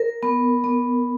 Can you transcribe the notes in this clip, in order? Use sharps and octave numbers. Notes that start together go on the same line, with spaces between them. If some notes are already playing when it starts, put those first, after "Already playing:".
Already playing: A#4
B3
B3